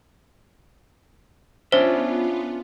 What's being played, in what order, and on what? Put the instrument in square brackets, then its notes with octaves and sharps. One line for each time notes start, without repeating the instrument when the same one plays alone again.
[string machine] B3 F4 [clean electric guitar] C#4 D4 E5 [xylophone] C5